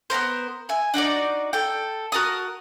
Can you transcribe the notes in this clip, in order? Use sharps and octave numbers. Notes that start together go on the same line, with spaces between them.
B3 C#4 A#4 C5
E5 G#5
D4 D#4 F#4 D5
A4 G5
F#4 A#4 A5 D#6